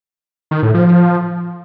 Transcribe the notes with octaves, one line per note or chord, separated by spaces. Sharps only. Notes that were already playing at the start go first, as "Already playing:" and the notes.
D#3
A2
F3